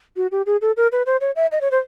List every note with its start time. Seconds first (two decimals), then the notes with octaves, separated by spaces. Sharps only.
0.17 F#4
0.32 G4
0.46 G#4
0.61 A4
0.77 A#4
0.92 B4
1.06 C5
1.21 C#5
1.36 E5
1.52 D#5
1.61 C#5
1.71 C5